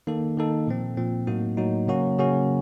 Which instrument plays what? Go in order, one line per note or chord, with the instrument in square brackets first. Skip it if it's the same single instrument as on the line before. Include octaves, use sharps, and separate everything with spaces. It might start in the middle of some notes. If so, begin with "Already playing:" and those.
[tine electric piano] D#3 A#3 D#4 A4
D#3 A#3 D#4 A4
A#2 F3 C4
A#2 F3 C4
A2 F#3 A#3 D#4 F#4
A2 F#3 A#3 D#4 F#4
C#3 F#3 A#3 C#4 F#4
C#3 F#3 A#3 C#4 F#4